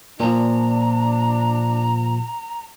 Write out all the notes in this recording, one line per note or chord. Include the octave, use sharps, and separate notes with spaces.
A#2 F3 D4 A#5